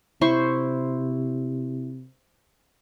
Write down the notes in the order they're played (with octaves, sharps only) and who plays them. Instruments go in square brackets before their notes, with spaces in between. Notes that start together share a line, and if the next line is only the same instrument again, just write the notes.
[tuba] C3 [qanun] E4 C5 C#6